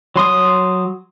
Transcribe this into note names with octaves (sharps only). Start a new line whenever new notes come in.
F#3 C6 D#6